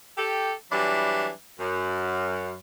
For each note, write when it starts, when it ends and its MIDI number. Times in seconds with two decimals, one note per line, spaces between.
0.18 0.53 67
0.18 0.53 69
0.71 1.30 52
0.71 1.30 54
0.71 1.30 55
0.71 1.30 62
0.71 1.30 64
1.60 2.55 42